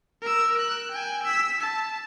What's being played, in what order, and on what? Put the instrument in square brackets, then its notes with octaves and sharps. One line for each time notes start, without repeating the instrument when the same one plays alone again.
[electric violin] A#4 E6
F#6
G5 G#5
E6 B6
A5